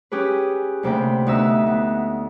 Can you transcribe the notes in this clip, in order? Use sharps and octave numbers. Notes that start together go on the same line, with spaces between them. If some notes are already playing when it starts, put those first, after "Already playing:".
C#4 G4 G#4 B4
D2 C3 A#3 G5 B5
D2 B3 D#4 E5 E6
B3